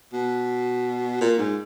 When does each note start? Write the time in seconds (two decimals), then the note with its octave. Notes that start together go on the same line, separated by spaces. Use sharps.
0.13 B2
1.21 A#2
1.38 G#2